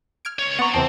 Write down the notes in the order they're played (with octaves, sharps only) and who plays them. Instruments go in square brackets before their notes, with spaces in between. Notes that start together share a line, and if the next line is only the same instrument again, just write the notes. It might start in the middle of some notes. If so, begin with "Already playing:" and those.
[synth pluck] F6 G#6 D7
[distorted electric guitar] C#2 C#5
[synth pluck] B3 [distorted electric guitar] F#5 A#5 [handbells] C#6 A6
[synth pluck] E2 C3 [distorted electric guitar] C4 [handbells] C5 A5